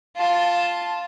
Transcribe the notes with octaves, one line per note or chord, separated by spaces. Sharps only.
F4 A5